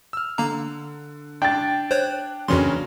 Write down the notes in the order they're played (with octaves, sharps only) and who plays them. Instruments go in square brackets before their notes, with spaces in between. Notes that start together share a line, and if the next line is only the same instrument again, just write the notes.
[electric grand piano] E6 F6
[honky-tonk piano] D3 [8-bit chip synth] A#3 A#5
[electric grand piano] D4 [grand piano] G5 A6
[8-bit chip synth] C5 C#5 [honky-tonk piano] F#6
[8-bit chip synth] F2 E3 C6 [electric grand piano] C#3 C#4 [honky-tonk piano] F#3 A#3 D4